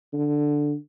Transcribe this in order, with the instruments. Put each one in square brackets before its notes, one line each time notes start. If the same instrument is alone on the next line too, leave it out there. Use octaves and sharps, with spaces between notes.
[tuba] D3